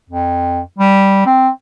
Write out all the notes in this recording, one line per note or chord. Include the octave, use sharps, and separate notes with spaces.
F2
G3
C4